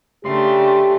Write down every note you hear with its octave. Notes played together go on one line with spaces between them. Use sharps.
C#3 A3 D4 G4 C6